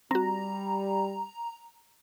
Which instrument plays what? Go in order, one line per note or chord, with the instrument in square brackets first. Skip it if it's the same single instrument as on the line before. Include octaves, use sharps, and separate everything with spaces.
[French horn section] G3 [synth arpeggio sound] C4 F#4 [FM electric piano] A#5